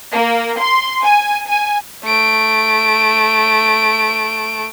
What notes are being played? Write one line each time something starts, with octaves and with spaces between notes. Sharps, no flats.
A#3
C6
G#5
G#5
A3 D7